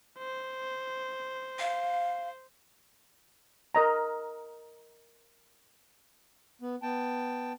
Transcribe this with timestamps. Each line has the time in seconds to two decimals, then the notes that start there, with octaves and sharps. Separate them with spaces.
0.18 C5
1.59 F5
3.75 A#4 D#5 A#5
6.62 B3
6.82 B3 G5 A5